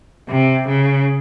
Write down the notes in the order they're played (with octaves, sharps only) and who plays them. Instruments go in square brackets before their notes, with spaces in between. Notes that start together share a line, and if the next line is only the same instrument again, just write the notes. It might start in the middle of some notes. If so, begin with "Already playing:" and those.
[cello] C3
C#3